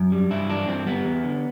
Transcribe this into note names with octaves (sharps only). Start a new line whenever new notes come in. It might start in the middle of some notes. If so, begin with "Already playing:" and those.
Already playing: F#2
G3
G2 E4
E3 D4
G2 C4
G3 B3
E2
D3